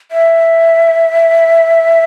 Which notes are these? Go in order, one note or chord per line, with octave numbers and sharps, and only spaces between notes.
E5